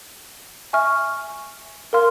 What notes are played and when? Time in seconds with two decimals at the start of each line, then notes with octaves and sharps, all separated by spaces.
0.73 E5 G#5 C#6 F6
1.93 A#4 F5 C6 F6